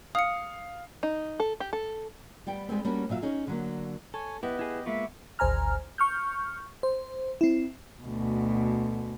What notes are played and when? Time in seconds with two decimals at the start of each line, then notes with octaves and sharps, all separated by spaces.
0.15 F5 D#6 C#7
1.03 D#4
1.40 A4
1.60 G4
1.73 A4
2.47 G3 B3 G5
2.69 G3 G#3 B3 C4
2.85 G3 A#3 C#4 D4 F#4
3.09 A#2 F#3 E5 F5
3.22 C#4 D#4 G#4
3.47 D3 F#3 A#3
4.14 A4 C#5 G#5
4.43 B3 E4 G4 B4 D#5
4.59 E4 G#4
4.86 G#3 A#3 F4 E5 B5 C#6 D6
5.39 G#1 D2 C5 G#5 A#5 F6
5.98 C#6 F6 G6
6.83 C5
7.41 C4 E4
8.04 D2 B2